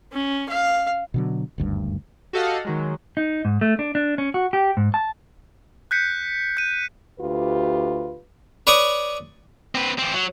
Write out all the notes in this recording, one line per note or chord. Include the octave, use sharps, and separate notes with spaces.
C#4
F5
B2 D3 F#3
F#1 D2 G2
F#4 G4 A4 D#5 F5 F#5
D#3 F#3 G#3
D#4
G#2
A3
D4
D4
C#4
F#4
G4
G#2
A5
F#6 G6 B6 C#7
G6 D#7
D2 F4 G4 B4
B4 C#5 D5 C#6 D#6
C4 B4
E3 C4
F#3